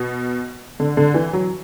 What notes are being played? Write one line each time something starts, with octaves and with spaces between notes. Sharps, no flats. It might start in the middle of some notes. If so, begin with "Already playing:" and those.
Already playing: B2
D3
D3
E3
F#3